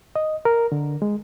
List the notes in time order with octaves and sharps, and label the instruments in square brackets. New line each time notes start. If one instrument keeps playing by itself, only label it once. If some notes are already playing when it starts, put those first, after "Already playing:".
[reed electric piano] D#5
A#4
D3
G#3